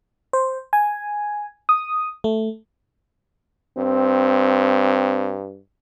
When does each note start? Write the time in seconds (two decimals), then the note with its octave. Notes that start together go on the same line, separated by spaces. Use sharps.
0.33 C5
0.73 G#5
1.69 D#6
2.24 A3
3.78 G2 C4